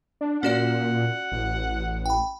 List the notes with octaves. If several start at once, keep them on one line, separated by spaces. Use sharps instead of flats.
D4
A#2 C#4 F#4 D5 F#5
A1
G5 B5